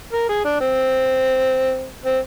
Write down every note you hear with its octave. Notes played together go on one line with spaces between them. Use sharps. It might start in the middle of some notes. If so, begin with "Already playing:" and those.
A#4
G#4
D4
C4
C4